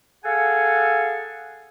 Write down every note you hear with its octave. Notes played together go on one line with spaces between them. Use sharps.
G#4 A4 F5 F#5 G#5